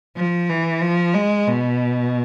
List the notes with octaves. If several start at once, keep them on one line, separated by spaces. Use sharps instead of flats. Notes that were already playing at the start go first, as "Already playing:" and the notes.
F3
E3
F3
G#3
B2